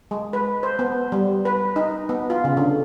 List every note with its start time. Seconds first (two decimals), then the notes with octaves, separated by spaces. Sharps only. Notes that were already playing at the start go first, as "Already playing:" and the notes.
0.11 G#3
0.33 B4
0.63 C5
0.79 B3
1.12 G3
1.45 B4
1.76 D#4
2.09 B3
2.30 F4
2.44 C#3
2.57 D3